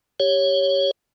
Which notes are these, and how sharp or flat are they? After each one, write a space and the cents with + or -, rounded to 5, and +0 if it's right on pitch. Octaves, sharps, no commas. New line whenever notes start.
G4 +0 C#5 +0